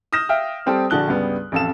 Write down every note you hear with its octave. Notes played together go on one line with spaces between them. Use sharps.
D#6 F6 G6 A#6 E7
E5 F5 G5 F6
G3 C4 G4 A4 C5
A#1 D3 F#4 A5 F#6 G7
C#2 G2 G3 B3
A1 F2 A4 F5 E7